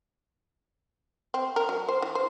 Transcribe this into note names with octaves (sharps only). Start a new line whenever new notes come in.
C4
A#4
F#3
C5
E3
C5